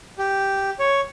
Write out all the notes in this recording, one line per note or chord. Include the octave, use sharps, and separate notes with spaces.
G4
C#5